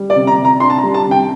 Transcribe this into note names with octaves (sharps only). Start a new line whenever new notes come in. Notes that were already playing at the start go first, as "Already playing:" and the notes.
Already playing: G3
D5
C3
A#5
C3
A#5
D4 C6
A5
A#5
G3
A5
C3 G5